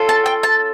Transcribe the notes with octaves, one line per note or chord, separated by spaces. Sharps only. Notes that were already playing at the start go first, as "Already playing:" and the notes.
Already playing: C#4 F4 A4
A5
G5
A5